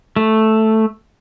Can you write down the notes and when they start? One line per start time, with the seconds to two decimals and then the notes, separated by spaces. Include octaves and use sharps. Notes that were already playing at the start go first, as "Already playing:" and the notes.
0.16 A3